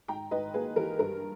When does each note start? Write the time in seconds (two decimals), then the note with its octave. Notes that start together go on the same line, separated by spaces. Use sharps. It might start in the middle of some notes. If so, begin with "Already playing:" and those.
0.08 G#2 G5 A#5
0.31 G#2 B4 D#5
0.54 A#3 G#4 B4
0.76 E3 G4 A#4
0.99 G2 G4 A#4